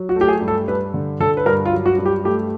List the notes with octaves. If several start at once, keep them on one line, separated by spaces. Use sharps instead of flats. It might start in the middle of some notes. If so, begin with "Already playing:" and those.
Already playing: F#3
F#4
A3
G4
G#4
G2
A4
G2 B4
D3
D3 A4
B4
G2 A#4
F4
F#3
F#4
G2
G4
A3 G4